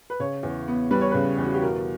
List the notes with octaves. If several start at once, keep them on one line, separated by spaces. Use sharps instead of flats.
B4
C#3 C#5
E2
B3
G3 B4
C#5
C#3 B4
E2
F#4
G4
B2 A#4